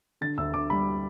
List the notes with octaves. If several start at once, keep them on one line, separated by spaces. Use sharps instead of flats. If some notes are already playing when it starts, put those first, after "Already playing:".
D3 A6
D2 E6
D2 D6
G3 B5